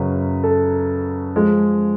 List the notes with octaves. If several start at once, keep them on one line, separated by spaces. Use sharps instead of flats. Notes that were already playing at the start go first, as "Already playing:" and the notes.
Already playing: F#2 C#3 F#3 B4
A4
F3 G#3